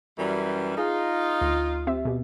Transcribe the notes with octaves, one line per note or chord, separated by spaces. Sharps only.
F#2 E3 G3
D#4 F4 G#4
D2
C4 G4 E5
B2 G4